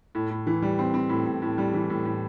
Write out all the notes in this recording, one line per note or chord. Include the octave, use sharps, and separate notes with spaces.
A2
A2
E3
G3
C4
C4
A2
A2
A2
G3
E3
A2
A2